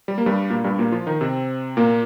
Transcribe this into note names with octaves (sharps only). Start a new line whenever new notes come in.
G3
A#3
G2 G3
A#2 A#3
G2 G3
A#2 A#3
F3 F4
D#3 D#4
C3 C4
A#2 A#3